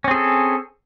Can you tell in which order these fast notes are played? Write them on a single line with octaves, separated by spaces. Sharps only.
C#4 C4 G#4 A4